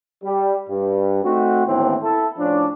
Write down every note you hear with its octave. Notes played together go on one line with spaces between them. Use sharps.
G3
G2
A3 C4 D#4 F#4
D#2 A2 D3 E3 B3 C4
E4 A4
A2 F3 C#4 D4